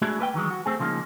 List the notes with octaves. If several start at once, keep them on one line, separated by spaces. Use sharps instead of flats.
G#3 A3 D4 E4 F#4 G#4
A#3 B4 E5 G5
D#3 E3 F#3 G#3
F#4
A3 C4 G#4
C#3 F3 G#3 A#3 D#4